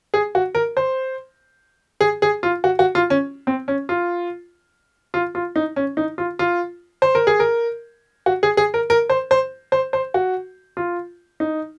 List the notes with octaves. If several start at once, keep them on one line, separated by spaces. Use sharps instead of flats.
G#4
F#4
A#4
C5
G#4
G#4
F4
F#4
F#4
F4
C#4
C4
C#4
F4
F4
F4
D#4
C#4
D#4
F4
F4
C5
A#4
G#4
A#4
F#4
G#4
G#4
A#4
A#4
C5
C5
C5
C5
F#4
F4
D#4